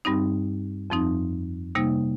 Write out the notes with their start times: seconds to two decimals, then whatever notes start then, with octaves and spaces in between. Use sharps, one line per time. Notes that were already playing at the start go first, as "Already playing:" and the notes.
0.05 G2 G3 C4 D#4
0.90 F2 F3 C4 D#4
1.75 C3 G3 A#3 D#4